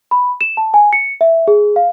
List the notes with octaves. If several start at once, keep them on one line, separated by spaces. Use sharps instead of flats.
B5
E7
A5
G#5
C#7
E5
G#4
F5